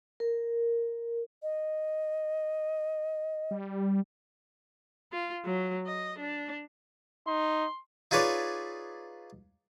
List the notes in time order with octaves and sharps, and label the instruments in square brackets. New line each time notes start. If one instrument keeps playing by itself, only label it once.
[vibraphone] A#4
[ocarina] D#5
[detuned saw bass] G3
[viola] F4
F#3
D#5
D4
[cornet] D#4 [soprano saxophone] C6
[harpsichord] D#4 F4 G#4 B4 C#5 D5